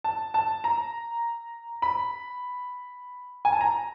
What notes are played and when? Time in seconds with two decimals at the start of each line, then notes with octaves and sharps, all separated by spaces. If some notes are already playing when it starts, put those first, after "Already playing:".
0.04 A5
0.34 A5
0.64 A#5
1.82 B5
3.45 G#5
3.52 A5
3.61 A#5